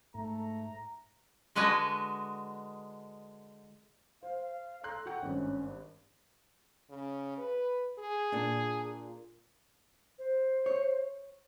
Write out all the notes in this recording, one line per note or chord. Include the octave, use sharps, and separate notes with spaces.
G#2 A3 A#5
D3 G#3 F#4 B4 D#5 G#5
C5 F5
F5
A4 A#5 C6 F#6
F#4 F#5 G5
G#1 G2 C#4
C#3
B4
G#4
A#2 D4
C5
C#5